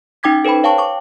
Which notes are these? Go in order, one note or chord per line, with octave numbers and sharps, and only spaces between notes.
C#4 D#4 G5 D6 G#6 B6
A4 B4 C5 G5 B5
C#5 F5 G5 A5 C#6
C#6 D6